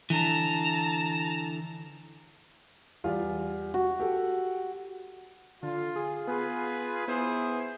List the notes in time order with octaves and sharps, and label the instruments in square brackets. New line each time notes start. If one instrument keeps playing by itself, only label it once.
[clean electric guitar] D3 E3 [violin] A5 A#5
[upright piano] E2 G3 F4
[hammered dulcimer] F#4
[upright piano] G4 A4
[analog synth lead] D3 [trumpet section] F4
[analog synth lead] G#4
[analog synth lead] B3 [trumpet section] F4 G#4 B4
[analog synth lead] B3 [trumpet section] E4 G#4 C5